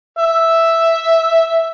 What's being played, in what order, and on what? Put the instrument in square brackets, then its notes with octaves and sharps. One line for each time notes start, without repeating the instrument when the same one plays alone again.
[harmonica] E5